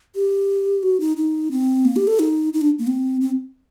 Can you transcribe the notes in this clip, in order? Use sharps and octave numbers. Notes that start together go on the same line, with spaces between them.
G4
F#4
D#4
D#4
C4
A#3
G4
A4
D#4
D#4
D4
A#3
C4
C4